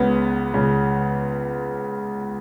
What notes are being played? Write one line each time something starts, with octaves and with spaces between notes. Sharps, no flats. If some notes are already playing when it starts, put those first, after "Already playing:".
Already playing: C#2 C#3 B3
C#2 C#3